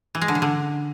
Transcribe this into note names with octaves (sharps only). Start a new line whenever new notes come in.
E3
G#3
D3
C#3
D3